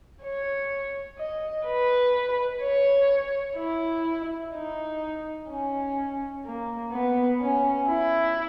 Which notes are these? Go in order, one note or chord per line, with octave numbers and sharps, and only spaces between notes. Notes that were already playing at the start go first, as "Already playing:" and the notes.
C#5
D#5
B4
C#5
E4
D#4
C#4
A#3
B3
C#4
E4